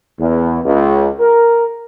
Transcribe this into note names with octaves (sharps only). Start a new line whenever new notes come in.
E2
C#2
A#4